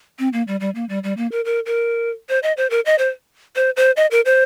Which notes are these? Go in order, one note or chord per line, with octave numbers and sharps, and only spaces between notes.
C4
A#3
G3
G3
A#3
G3
G3
A#3
A#4
A#4
A#4
C5
D#5
C5
A#4
D#5
C5
C5
C5
D#5
A#4
C5